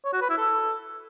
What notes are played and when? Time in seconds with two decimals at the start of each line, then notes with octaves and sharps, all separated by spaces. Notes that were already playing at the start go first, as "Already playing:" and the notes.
0.05 C#5
0.13 F#4
0.21 B4
0.30 E4
0.38 A4